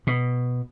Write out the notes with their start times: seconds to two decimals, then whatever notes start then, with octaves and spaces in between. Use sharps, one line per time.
0.07 B2